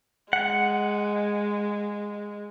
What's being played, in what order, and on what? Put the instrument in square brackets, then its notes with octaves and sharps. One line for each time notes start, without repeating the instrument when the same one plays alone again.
[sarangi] G#3 [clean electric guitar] F#5